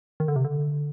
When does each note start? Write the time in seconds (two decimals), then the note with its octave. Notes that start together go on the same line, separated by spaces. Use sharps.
0.20 D#3
0.28 D3
0.36 C3
0.45 D3